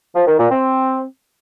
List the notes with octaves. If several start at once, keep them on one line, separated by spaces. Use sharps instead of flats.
F3
D#3
A#2
C4